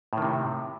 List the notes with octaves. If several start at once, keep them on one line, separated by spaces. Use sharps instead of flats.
A2 C3 D#3